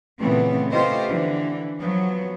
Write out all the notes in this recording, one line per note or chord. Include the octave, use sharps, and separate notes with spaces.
A#2 C#3 E3 A3 B3 C4
A3 B3 F4 G4 C5 D#5
D3 E3
F3 F#3 B3